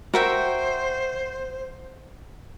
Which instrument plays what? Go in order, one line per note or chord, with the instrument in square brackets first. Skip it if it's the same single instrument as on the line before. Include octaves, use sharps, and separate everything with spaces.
[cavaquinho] F#4 E5 G5 [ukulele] A#4 [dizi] C5